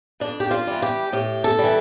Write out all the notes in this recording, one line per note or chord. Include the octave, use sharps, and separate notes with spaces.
F2 D4
G4
F4
E3 G3
G4
A2 G4
A4
G3
E3